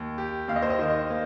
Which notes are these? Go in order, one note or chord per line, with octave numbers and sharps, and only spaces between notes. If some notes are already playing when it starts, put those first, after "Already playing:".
Already playing: D#2
G4
D#2 F5
D#5
C5
D#5
D#3
A#3